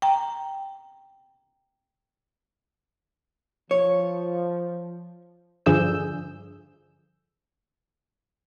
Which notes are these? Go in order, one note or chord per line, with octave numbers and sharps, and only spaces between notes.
G5 A#5
F3 C#5
G2 D3 F3 G#4 E6 G6